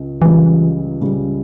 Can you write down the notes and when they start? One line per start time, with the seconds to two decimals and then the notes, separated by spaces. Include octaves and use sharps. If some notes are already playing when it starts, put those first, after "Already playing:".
Already playing: C#2 C#3
0.21 C#2 C#3 E3 G3
1.00 C#2 C#3 G3